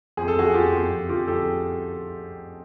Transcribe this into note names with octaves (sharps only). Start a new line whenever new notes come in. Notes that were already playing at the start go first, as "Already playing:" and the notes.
F2 G#4
A4
F2 F#4 G#4
F2 F4 G4
F2
F2
D3 F4 G4
F2 G4 A4